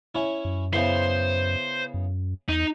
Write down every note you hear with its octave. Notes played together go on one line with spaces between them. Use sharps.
C#4 E4
F#2
C#3 B3 E4 C5
F#2
E2 D#4